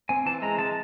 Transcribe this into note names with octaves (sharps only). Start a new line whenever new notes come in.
C4 G#5
E3 A5
G#3 A#5
G#3 A5